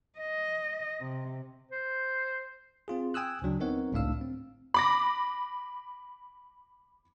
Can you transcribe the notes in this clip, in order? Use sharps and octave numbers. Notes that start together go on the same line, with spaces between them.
D#5
C3
C5
C4 F4 G#4
G5 G#5 D#6 E6 F#6
D2 C#3 F#3 D4
B3 C4 D#4 A#4 C#5 F#5
G#1 C#2 A2 D4 F5 E6
C4
B5 D6 A#6